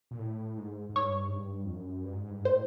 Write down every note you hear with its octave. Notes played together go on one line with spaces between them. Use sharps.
A#2
A2
G#2
G#2
G2 C#5
G#2
G2
F2
F#2
G2
G#2
G2
G#2 C5
A2